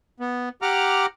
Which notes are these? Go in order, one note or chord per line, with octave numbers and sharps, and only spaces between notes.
B3
G4 F#5 A#5 D6 F6